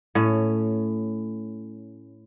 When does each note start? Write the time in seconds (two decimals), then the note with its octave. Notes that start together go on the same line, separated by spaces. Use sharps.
0.15 A2 C#4